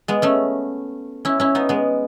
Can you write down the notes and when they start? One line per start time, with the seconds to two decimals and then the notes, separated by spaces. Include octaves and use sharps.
0.08 G#3 B3
0.22 A3 C#4
1.25 C#4 E4
1.40 C#4 E4
1.55 B3 D#4
1.69 G#3 B3